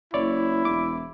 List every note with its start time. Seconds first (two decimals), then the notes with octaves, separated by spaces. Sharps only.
0.14 F#1 E4 C#5 D5
0.65 E1 D6